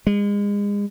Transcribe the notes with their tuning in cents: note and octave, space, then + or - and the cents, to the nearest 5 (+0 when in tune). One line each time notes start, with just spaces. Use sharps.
G#3 -35